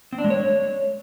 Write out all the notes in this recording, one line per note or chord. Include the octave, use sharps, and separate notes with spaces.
C4
D4
G#3
C#5